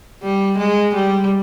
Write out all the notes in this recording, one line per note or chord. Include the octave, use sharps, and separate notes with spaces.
G3
G#3
G3